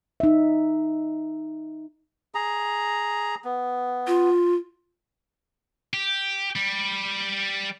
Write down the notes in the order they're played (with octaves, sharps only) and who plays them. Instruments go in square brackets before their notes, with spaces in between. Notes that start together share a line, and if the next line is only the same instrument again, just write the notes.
[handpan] D#4 E5
[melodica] G#4 A#5
B3
[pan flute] F4
[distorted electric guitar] G4
G3